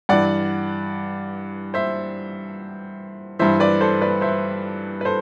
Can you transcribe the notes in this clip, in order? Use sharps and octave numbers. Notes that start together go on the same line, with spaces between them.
G2 E3 D5 F#5
C5 E5
G2 E3 C5 E5
B4 D5
A4 C5
B4 D5
C5 E5
B4
A4 C5